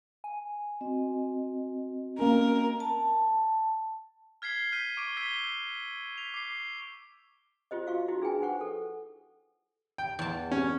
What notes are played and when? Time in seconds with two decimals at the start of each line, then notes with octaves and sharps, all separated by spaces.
0.24 G#5
0.81 C4 F#4 D#5
2.19 A#3 C#4 A#4
2.80 A5
4.42 F6 G#6 B6 C7 G7
4.72 F6 G6 B6 D#7
4.97 C#6 D6 D7 D#7 G7
5.17 E6 G#6 B6 G7
6.18 B6 F7
6.34 D6 C7
7.71 F4 G4 C5 D#5
7.87 F#4 F5 C#6
8.08 D#4 E4 F#4 G4
8.21 D4 G#4 B4 G5 G#5
8.42 B4 C5 F#5 C#6
8.61 A4
9.98 G5
10.19 E2 A5
10.51 C#4